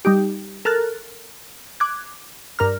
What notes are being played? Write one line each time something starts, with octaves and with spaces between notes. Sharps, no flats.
G3 D#4 G4
A4 A#4 F6 F#6 A6
D6 F#6 G#6
G2 A#4 A#5 F6